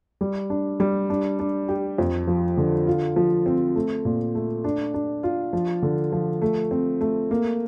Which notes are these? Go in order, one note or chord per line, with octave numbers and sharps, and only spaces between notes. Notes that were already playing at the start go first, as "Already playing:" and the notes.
G3
D4
G3
D4
D4
G4
F2
F3
D3
F4
F3
C4
A3
A#2
A3
D4
D4
F4
F3
D3
F3
A3
C4
A3
A#3